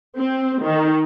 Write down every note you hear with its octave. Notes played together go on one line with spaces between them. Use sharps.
C4
D#3